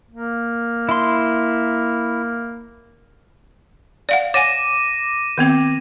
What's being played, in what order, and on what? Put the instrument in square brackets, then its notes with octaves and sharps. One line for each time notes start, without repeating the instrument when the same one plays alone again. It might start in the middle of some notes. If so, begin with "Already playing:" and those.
[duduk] A#3
[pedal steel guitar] E4 C6
[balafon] D5 F5 F#5
[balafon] C#5 F#5 G#5 [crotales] D6 A#6 D#7
[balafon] D#3 B3 C4